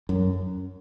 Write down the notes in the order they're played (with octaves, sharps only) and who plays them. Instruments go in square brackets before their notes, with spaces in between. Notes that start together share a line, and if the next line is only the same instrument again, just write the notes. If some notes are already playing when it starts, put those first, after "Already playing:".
[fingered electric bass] F#2